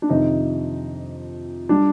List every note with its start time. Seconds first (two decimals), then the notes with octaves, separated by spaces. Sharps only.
0.02 D4
0.09 F2 C3 D#3 D#4
1.69 G3 D4